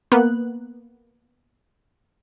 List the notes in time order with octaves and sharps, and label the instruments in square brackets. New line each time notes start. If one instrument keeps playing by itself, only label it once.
[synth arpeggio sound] A#3 B3 F#6